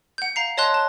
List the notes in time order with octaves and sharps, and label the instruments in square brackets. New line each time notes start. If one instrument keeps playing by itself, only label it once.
[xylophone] F#5 G6
F5 A#5 C7
C#5 D#5 A5 A#5 C6 F#6
A5